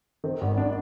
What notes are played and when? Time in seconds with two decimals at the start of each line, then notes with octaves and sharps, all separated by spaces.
0.24 D#3 C4
0.41 G#1
0.58 D4